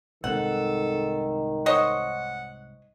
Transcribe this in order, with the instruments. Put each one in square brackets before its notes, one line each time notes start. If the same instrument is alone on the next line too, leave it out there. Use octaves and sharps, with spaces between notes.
[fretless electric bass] C2 G#2 C4 [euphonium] D#3 [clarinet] A4 [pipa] F#5
[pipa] C5 C#5 D#5 [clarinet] F#5